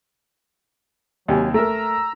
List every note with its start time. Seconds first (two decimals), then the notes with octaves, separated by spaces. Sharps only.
1.28 D#2 C3 F#3 G#5
1.54 A3 A#4 A#5 E6